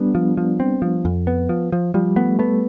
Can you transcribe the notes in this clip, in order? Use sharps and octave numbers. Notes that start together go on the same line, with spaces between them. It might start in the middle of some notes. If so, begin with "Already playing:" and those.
Already playing: G3 B3 D4
F3
F3
C4
F3
F2
B3
F3
F3
F3 G3
A3 B3
A3 B3